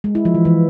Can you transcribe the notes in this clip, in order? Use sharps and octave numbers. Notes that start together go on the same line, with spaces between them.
G#3
E4
F3
E3
E3